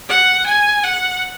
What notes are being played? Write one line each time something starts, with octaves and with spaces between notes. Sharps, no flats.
F#5
G#5
F#5